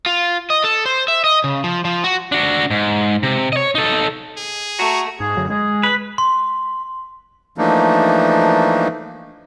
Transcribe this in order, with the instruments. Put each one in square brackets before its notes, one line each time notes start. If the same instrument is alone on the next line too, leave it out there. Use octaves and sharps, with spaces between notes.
[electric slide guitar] F4
D#5
A4
C5
E5
D#5
C#3
F3
F3
F#4
[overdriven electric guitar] D4 F#4
G#2
C3
C#5 D#5
D#4 A4
[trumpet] G#4
[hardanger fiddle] A3 [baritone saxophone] F#4 [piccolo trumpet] A#5
[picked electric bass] G#2 [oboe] G#4
[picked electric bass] F#2 D3 F#3
[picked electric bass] G#3 [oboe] G#4
[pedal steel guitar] B4
[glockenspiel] C6
[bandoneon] E3 F3 A3 A#3 D4 D#4